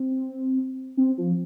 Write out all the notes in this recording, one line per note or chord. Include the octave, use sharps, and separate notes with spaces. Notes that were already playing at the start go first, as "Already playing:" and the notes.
Already playing: C4
C4
F3